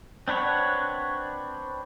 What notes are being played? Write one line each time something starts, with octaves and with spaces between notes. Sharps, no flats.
C4 D4 B4 C#5 F#5